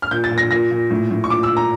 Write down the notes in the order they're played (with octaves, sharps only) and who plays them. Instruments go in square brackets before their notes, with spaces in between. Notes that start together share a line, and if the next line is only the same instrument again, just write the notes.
[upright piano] F6
A#2 G6
A6
A#2
A#6
A#2 A#6
A#2
A2
A2
C#6
A#2 D6
E6
A#2
A#5